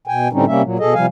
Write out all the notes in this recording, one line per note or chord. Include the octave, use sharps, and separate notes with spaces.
B2 G5 G#5
A2 D3 G3 C4 C#4 D#4
C3 G3 A#3 C#4 E5
A#2 F#3
B2 G#4 A4 D#5
C3 F3 G3 F5 G#5